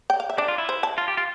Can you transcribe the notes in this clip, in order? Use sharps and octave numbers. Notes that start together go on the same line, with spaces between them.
G5
F5
E5
D4 D5
F4
E4
C5
A5
F4
G4
F4